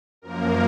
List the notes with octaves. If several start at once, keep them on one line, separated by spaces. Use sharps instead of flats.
F#2 F3 A#3 A#4